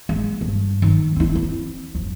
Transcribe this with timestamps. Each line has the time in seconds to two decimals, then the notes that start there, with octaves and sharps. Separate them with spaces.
0.09 G#3
0.41 G2
0.82 D#3
1.16 C4 E4
1.35 C4
1.95 F2